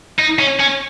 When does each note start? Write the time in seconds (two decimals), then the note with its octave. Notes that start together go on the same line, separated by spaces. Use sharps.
0.19 D#4
0.40 C#4
0.60 C#4